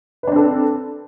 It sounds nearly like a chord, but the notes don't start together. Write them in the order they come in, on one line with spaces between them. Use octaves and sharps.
B4 D4 C4 A4